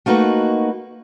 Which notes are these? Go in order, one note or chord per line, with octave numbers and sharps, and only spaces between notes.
A3 A#3 D#4 F#4 B4